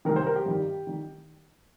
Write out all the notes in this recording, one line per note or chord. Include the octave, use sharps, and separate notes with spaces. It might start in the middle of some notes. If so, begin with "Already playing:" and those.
C2 C3 D#3 A#4
C5
A#4
G4
G2 D#3 G3
D#3 G3